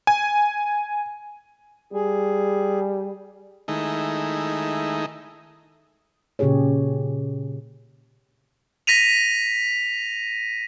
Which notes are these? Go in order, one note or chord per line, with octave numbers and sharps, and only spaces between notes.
G#5
G3 G#4
D#3 G#3 A3 D#4 E4
A#2 C#3 C#4 G4 G#4 C#5
A#6 B6 D#7 F7